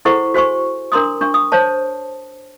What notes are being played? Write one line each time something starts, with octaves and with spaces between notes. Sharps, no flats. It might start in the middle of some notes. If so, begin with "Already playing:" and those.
E4 G#4 A4 C5 F#5 C#6
F#4 C5 G#5 C#6
D4 A#4 A#5 C6 D6 D#6
D4 C#6
D#6
C5 C#5 A5